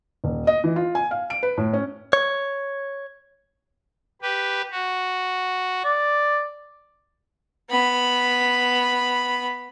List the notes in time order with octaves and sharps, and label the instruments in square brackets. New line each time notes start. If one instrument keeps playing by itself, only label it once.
[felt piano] D#1
D#5
E3
F4
G#5
F5
D7
B4
A2
C#4
[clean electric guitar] C#5
[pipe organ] G4 B4
F#4
[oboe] D5
[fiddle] B3 B5